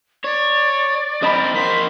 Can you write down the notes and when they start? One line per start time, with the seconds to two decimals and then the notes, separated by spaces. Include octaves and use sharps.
0.25 C#5 D5
1.22 C4 A#4 D#5 B5 D#6
1.54 A#3 C5 B6